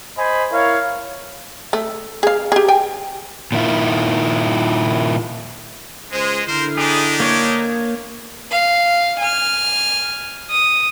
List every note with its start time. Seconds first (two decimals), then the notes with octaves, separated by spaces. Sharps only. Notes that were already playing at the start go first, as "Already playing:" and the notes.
0.18 C5 D#5 G#5 B5
0.52 E4 A#4 C#5 F5
1.73 A3
2.23 G#4 F5
2.52 G4 G#4
2.68 G5 G#5
3.52 A#2 D#3 E4 F4
6.12 C#2 G#3 C5
6.48 D3 E4 A#4 C5
6.77 D4 D#4 G4 G#4
7.20 A#3 C#5
8.51 F5
9.20 G#5 F6
10.50 D#6